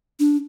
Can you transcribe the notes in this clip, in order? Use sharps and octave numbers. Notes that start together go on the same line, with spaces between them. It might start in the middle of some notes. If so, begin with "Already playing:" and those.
D4